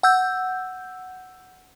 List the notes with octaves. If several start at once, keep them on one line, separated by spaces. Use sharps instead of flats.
F#5 E6 G6